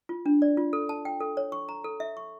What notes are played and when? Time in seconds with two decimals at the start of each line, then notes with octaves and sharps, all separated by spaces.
0.09 F4
0.26 D4
0.42 D5
0.57 F4
0.73 A4
0.89 A5
1.05 G5
1.20 A4
1.37 C#5
1.52 C#6
1.69 A#5
1.84 A4
2.00 E5
2.17 C#6